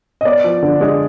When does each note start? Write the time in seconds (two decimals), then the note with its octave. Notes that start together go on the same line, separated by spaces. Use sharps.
0.21 D#5
0.25 B3 D5
0.44 F3
0.62 D3
0.81 G#3